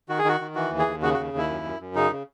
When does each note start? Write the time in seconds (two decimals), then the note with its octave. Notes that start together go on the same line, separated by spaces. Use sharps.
0.09 D#3 F#4
0.19 G#4
0.24 D#3 F#4
0.40 D#3
0.55 E3 F#4
0.71 D#2
0.79 G#4
0.86 D#2
1.02 C#3 F#4
1.14 F#4
1.18 D#2
1.33 D#2 E4
1.49 F#2
1.64 F#2
1.80 F#2
1.95 C#3 D#4
2.12 C#3